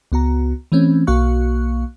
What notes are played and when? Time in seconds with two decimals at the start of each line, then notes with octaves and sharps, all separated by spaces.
0.12 C#2 B3 F#4 A#5
0.72 E3 A3 C4 C#4
1.07 B1 A#3 F#4 F5 C#6 F#6